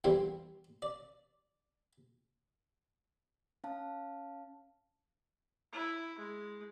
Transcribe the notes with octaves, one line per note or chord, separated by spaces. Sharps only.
E2 G2 D3 G3 C4
D5
C#4 F5 A5
E4
G#3